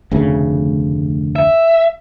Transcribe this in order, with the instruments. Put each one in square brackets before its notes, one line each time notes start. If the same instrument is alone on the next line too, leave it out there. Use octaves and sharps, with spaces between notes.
[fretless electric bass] F1 D2 C#3
[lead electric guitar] E5